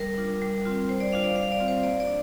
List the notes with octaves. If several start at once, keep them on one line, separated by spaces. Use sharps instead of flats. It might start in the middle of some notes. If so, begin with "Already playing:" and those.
Already playing: G3 A#4
D4 F4
G3
C4 F4
G3 C5
D5
D4 F4 F5
D5
G3 F5
D5
C4 F4
C5
A#3 D5
D5
D4